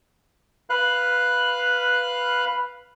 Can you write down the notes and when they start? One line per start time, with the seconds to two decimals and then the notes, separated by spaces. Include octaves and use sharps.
0.70 B4 F5 F#6